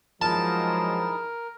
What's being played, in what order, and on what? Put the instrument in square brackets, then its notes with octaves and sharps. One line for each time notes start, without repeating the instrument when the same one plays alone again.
[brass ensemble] F3 F#3 G#3 [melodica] D#4 E4 G#4 [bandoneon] A#4 [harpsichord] A5